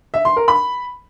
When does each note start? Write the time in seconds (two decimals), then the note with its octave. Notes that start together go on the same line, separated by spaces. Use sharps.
0.14 E5
0.25 C6
0.36 A#4
0.48 B5